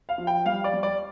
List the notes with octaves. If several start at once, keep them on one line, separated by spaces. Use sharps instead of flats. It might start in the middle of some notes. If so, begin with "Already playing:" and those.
F5
F3
G5
G3 F5
D5
G3
D5